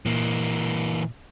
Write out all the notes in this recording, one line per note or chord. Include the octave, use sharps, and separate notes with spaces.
A#2 E3 A#3